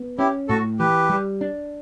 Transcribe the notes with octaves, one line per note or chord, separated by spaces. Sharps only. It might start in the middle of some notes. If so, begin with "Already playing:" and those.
Already playing: B3
C#4 E4 G4
A2 F#4 A4
E3 G4 B4
G3
D4